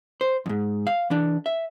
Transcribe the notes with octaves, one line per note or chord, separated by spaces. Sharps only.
C5
F2 G#2
F5
E3 D4
E5